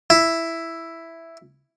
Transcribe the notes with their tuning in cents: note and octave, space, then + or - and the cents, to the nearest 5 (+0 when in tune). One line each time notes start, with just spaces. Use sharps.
E4 +5